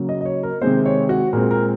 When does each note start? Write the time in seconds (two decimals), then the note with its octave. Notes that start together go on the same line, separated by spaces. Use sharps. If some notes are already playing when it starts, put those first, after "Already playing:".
Already playing: C#3 F#3 A#3
0.09 D#5
0.21 D#5
0.25 C#5
0.43 A#4
0.61 C3 D#3 G#3 C4 C5
0.86 C#5
1.09 F#4
1.33 A#2 G#3 C4 A#4
1.51 A#4